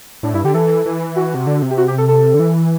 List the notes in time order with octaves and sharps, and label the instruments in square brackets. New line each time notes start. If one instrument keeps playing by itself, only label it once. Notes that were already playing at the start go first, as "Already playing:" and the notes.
[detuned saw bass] A2 [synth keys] D4
[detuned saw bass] G2 [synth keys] E4
[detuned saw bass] D3 [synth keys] G4
[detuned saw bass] E3 [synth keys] A4
[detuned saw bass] E3
[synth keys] F#4
[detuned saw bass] C3
D3
C3
[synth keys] G4
F#4
G4
A4
A4
[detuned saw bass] D3
E3